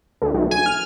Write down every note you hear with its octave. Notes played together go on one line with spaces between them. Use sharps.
D2
B1
G#5
F6